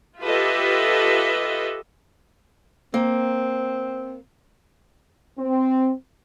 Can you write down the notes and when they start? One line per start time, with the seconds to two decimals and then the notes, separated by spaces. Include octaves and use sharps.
0.21 F4 G4 A4 B4 D#5 E5
2.94 A#3 C4
5.38 C4